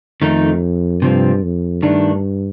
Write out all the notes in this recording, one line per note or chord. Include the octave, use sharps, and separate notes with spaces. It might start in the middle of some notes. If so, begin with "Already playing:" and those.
F2 D#3 A3 D#4
G2 C3 F3 C4
F2
G2 D#3 A3 D4